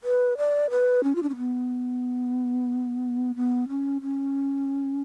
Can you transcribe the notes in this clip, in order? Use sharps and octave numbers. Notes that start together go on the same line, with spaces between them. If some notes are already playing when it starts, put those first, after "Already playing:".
B4
D5
B4
C#4
F4
D4
C#4
B3
B3
C#4
C#4